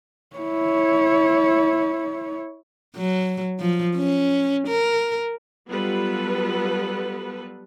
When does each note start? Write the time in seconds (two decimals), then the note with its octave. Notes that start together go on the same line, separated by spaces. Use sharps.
0.36 E4 C#5
2.96 F#3
3.60 F3
3.96 C#4
4.68 A#4
5.68 F#3 G3 B3 F4 A4 B4